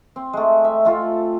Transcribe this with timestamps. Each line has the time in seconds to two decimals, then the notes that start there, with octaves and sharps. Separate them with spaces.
0.16 C4
0.33 G#3 A3
0.64 E5
0.85 A3 F4 A4